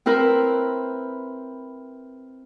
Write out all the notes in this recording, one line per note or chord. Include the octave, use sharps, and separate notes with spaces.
C4 E4 A#4 B4